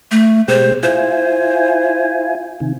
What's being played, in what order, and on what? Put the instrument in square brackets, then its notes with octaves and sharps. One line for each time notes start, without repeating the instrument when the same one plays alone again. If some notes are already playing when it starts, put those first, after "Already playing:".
[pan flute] A3
[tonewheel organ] B2 G#3 G4 [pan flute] C5
[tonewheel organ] E4 F4 G#5 [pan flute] C5
[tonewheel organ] C3 D#3